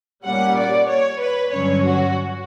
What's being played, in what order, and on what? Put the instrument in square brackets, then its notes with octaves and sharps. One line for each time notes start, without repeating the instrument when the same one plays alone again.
[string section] A#2 G3 A#3 C#4 F#5
D5
C#5
B4
G2 D3 F#3 C#4 C#5
F#4